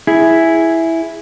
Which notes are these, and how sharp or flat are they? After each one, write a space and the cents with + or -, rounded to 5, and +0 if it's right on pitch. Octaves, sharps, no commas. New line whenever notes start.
E4 +0 G#4 +0